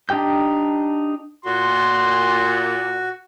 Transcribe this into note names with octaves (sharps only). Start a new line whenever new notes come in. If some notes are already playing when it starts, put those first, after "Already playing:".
D4 D#4 G4 G5 G6
A#2 F#4 C6